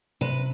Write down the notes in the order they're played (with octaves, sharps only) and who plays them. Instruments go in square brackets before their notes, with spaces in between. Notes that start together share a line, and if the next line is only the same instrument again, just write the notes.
[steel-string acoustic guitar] C3 B4